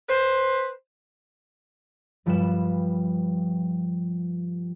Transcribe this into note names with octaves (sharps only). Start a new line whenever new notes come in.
B4 C5
G2 F3 G3 B4 F#6 E7